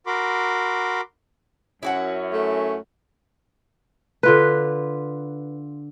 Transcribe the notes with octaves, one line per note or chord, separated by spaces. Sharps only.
F#4 A#4 B5 C6 D6
F#2 C#4 E4 F#4 F#5
A3
D3 F4 B4